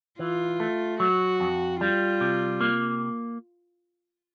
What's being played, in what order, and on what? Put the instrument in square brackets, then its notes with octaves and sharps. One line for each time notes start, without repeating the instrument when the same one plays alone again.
[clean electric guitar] E3 [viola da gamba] F4
[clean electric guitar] A3
[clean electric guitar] F#3 [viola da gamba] F#4
[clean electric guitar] F2
[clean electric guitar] G3 [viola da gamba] F4
[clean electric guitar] C3
A#3